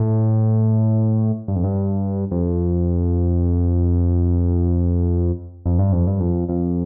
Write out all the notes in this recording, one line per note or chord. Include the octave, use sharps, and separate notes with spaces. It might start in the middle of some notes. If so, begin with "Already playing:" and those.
Already playing: A2
G2
F2
G2
F2
F2
G2
F2
G2
F2
F2